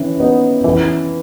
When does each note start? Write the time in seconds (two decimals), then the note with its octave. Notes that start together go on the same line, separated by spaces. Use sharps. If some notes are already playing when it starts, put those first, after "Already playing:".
Already playing: E3 C#4
0.20 B3 D#4
0.64 E3